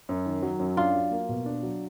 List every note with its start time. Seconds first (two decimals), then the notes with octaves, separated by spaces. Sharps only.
0.09 F#2
0.25 D#3
0.43 F#3
0.60 F#2
0.77 D4 F4
0.94 F#3
1.11 A#3
1.29 B2
1.46 D4
1.63 F#3